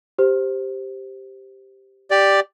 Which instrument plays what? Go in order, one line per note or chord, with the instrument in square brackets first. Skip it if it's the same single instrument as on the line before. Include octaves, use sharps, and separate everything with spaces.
[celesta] G4 C5
[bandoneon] G4 D5